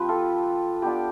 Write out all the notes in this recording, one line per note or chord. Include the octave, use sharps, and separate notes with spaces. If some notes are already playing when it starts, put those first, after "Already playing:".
Already playing: F3 C4 G4 B4
F4 A4
B3 D4 F4 G4